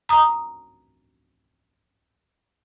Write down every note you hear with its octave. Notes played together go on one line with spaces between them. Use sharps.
A#5 D#6